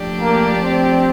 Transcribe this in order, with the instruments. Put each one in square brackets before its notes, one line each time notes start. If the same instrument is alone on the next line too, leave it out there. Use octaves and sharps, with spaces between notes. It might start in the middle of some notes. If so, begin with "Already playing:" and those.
Already playing: [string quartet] F3 A3 D4 G4 D5
[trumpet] A#3
C4